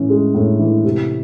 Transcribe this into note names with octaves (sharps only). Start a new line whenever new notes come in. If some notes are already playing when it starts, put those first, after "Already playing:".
Already playing: A2 E3 C#4
G#3
A2
E3
C3